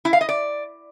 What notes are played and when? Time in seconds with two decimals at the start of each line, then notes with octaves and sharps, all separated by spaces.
0.05 E4
0.13 F5
0.21 D#5
0.29 D5